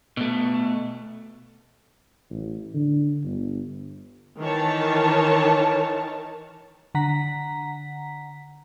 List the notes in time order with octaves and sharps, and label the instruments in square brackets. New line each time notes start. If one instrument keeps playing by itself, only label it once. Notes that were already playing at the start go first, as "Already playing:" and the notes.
[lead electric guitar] B2 A3
[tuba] A1
D3
G1
[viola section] D#3 E3 C#5 A5
[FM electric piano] D3 F#5 A#5 B6